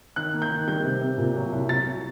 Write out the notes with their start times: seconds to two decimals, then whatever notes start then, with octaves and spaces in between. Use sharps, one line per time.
0.16 D#3 F#6
0.34 A#3
0.42 G6
0.51 D#3
0.68 G3 G6
0.84 C3
1.01 C3
1.18 A#2
1.36 F#3
1.52 C2
1.69 F#3 A6
1.86 C2